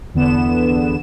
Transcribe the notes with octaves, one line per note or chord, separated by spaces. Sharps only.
E2 D3 B3 E7